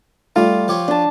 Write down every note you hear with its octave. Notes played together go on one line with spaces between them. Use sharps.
G3 A3 F4
F3 G4 C#5
D4 A5